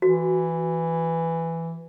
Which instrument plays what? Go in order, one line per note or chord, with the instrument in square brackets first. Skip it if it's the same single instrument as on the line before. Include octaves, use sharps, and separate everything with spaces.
[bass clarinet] E3 [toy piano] F#4